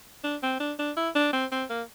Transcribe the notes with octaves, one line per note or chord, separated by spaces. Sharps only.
D4
C4
D4
D4
E4
D4
C4
C4
A#3